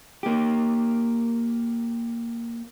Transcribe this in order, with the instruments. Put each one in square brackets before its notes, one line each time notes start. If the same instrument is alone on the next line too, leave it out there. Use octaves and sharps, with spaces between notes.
[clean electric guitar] A#3 G4